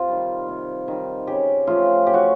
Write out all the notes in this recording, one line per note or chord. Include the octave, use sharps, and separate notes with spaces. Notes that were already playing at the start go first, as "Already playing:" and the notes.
Already playing: C3 F4
D#3 G3
C3
D#3 G3
C#3 G4
F3 A3 C#4 F4
C#3 G4
F#4